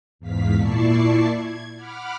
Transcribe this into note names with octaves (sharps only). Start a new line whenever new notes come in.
E2 G#2 F5 B6
A#2 E4 D5 A5 C#6 C7
G#6
F#5 B5 D6 F6